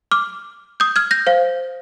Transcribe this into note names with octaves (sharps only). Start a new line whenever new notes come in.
D6 F6
D#6 G6
F6 G#6
G6 A#6
C5 F5